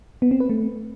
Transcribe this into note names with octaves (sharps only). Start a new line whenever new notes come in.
B3
C4
B4
A3